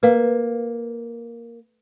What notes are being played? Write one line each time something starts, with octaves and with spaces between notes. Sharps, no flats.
A#3 B4 F5